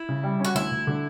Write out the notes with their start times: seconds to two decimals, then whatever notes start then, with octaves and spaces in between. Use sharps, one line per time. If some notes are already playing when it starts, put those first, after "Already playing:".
Already playing: E4
0.09 C#3
0.23 G3
0.40 C#4 F#4
0.55 D2 E4
0.72 D2
0.87 D3